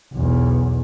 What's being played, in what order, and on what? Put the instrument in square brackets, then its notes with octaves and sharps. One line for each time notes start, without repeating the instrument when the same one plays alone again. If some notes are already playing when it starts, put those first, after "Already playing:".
[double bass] B1 E2